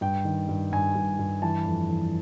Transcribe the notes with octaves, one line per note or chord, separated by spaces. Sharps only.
G2 G5
D#3
G2
G2 G#5
G2
G2
E3 A5
F2
E3